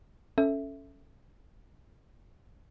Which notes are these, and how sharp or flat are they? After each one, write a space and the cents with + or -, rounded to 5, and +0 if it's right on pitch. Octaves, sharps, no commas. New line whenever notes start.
C#4 +0 A4 +0 E5 +0